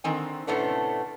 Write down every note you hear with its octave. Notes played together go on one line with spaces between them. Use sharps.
D3 D#3 C4 G#5
A2 C3 A3 B3 C#4 D4